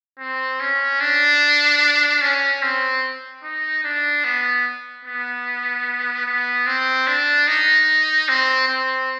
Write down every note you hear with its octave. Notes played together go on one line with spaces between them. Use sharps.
C4
C#4
D4
C#4
C4
D#4
D4
B3
B3
B3
C4
D4
D#4
C4
C4